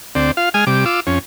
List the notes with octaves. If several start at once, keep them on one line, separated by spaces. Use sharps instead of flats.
D2 C4 D5
F4 F5
G#3 G#5 D#6 F6
C3 G3 D6
F4 D6 E6
F2 C#4